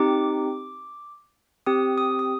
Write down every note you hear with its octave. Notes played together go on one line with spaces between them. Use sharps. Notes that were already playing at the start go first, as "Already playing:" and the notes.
Already playing: C4 D#4 G4 D6
C4 G4 D#6
D#6
D#6